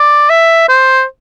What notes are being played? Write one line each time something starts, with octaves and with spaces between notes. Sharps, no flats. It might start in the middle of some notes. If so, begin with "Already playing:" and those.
Already playing: D5
E5
C5